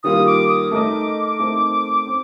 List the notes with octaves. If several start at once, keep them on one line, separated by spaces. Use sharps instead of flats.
D#3 G3 A#3 F4 D#6
D6
D#6
A3 D#4 A#4 D#5 D6
A3 C4 D#4 A#4
C4